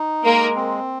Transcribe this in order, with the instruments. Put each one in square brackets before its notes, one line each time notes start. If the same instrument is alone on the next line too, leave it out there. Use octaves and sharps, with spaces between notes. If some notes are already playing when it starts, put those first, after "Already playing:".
Already playing: [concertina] D#4
[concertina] G#3 [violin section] A#3 A#4
[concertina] C4